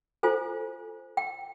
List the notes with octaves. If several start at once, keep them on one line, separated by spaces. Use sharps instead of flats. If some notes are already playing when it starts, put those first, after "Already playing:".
F4 A4 C5 G#5
G5